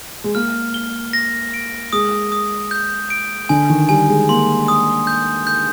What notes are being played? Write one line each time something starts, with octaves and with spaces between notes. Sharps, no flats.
G#3
A#3 F6
G7
A#6
D7
G#3 D#6
D#6
G6
D7
D3 G#5
D#3
G3 G#5
G#3
A#3 C6
D#6
G6
G6